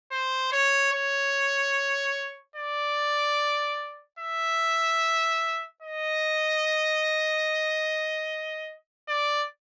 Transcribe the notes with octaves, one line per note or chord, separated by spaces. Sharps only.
C5
C#5
C#5
D5
E5
D#5
D5